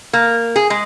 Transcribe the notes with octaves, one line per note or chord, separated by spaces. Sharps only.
A#3
G#4
G#3